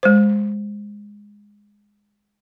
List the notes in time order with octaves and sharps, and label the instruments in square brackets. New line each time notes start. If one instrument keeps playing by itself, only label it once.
[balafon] G#3 C5